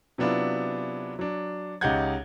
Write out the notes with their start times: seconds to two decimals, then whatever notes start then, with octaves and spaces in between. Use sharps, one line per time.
0.18 C3 F#3 B3 D4 E4 F4
1.19 F#3 D4
1.81 C#2 D#4 G4 F#5 G6 G#6